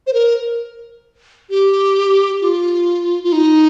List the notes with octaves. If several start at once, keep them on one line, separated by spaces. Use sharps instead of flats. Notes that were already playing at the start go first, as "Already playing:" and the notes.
C5
A#4
G4
F4
F4
D#4